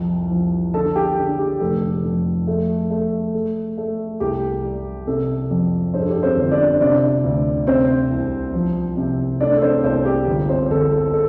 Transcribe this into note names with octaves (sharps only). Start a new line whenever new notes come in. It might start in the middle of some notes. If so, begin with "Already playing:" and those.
Already playing: C2 F2
F3
D3 A4 A5
G4 G5
D3
G4
F1 A4
F2
A3
A3
A3
A3
C2 G4
G3
C3 A4
F2
G2 C5
A4
G4
A4
C4 C5
G1
D4 D5
C3 D4 D5
D2
C3 C4 C5
C2
F3
C3
A3 D4 D5
A4
C4 C5
C2 C4 C5
G4
G1
C4 C5
G1 A4
A4
A4